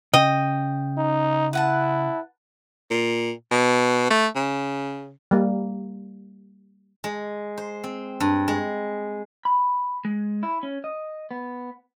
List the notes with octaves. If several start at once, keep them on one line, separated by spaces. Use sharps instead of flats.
C#3 D#5 G5
D#4
E4 B4 F#5 A5
A#2
B2
A3
C#3
G3 A#3
G#3
C5
C4
G2
G#3
B5
G#3
E4
C#4
D#5
B3